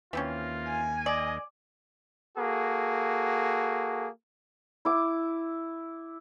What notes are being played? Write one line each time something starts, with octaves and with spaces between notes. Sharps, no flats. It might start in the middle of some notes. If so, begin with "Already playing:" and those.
D#2 E3 A#3 C4 C#4 F4
G#5
D5 D#5
A#3 F#4 G#4 A4
E4 D6